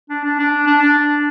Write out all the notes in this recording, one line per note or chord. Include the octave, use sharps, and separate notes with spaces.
D4
D4
D4
D4
D4